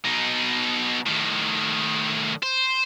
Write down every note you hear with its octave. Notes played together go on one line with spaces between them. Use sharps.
B2 D#4
A2 D#3
C5